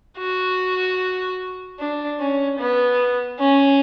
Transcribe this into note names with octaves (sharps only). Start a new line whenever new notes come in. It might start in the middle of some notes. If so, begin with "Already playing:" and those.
F#4
D4
C#4
B3
C#4